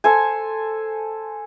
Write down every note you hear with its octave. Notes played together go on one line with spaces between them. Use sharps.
A4 C5 G#5